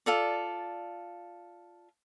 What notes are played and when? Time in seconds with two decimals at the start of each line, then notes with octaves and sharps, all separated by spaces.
0.06 F4 A4 D5